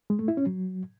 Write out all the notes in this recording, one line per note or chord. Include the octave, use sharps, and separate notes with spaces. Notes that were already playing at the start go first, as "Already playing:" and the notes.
G#3
A3
E4
C#4
F#3